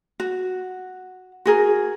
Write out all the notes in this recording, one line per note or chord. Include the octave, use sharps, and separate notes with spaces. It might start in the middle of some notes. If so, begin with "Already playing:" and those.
F#4
F#4 G#4 A#4